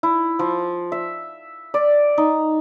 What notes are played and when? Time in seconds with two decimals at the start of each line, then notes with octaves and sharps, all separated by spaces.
0.03 E4
0.39 F3
0.92 E5
1.74 D5
2.18 D#4